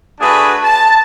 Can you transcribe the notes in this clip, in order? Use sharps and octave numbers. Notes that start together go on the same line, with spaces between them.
A3 D4 F#4 G#4 B4
A5